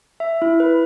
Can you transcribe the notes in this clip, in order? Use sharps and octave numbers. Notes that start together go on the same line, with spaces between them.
E5
E4
B4